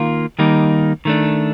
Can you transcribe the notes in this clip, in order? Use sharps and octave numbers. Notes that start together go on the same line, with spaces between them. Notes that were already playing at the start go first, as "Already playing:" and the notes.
Already playing: D#3 A#3 F4
D#3 G3 A#3 D#4
D#3 A3 D4